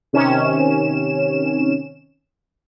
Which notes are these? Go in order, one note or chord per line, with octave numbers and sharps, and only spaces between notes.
C3 D#3 C#4 E7